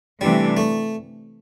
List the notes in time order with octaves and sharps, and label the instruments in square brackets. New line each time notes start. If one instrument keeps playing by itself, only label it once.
[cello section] C3 E3 A3 D4 [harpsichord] G3
[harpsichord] A3